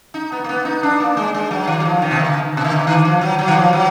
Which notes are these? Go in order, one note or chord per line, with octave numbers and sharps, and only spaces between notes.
D#4
B3
A#3
B3
D#4
D4
A#3
G#3
G#3
F#3
D#3
F#3
F3
D#3
B2
D3
B2
D3
D#3
F3
F#3
F#3
D#3
F3
F#3